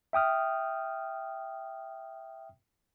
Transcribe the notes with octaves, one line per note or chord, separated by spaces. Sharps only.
E5 G5 D#6 F6